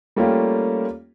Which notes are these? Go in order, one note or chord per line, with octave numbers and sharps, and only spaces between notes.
G3 A3 A#3 C#4 F4 G4